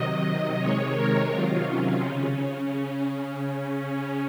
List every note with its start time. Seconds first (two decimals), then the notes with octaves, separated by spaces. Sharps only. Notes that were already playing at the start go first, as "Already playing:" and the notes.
Already playing: C3 D#3 F#3 D#5
0.23 D#5
0.58 C3 D#3 G#3 C#5
0.94 A#4
1.29 C3 D#3 F#3 F4
1.65 C#4
2.00 C#3 C#4